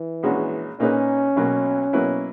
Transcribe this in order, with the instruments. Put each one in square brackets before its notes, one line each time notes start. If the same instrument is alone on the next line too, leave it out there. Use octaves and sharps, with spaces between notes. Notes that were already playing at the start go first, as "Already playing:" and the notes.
Already playing: [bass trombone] E3
[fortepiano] A#1 A#2 G#3 C#4 F#4
[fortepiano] A#2 A#3 D#4 G#4 B4 [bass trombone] C#4
[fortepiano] B1 B2 F#3 A#3
B2 F#3 A#3 E4 B4